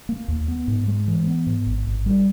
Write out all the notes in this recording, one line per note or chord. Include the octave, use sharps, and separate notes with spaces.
A#3
D#2
B3
G#2
G#3
E3
B3
G#2
G#1
G#1
G3